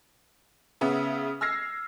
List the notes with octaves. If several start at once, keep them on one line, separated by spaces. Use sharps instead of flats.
C#3 B3 C#4 E5
E6 F6 G#6 A#6 C7